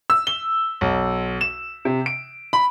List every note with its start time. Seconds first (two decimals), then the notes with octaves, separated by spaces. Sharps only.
0.10 E6
0.27 G7
0.81 B1
1.41 E7
1.85 C3
2.06 D7
2.53 B5